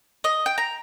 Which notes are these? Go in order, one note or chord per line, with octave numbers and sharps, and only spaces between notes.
D#5
G5
A#5